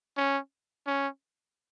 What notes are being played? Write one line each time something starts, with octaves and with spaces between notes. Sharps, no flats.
C#4
C#4